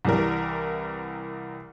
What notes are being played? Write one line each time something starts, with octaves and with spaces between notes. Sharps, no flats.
C2 E3 G3 A#4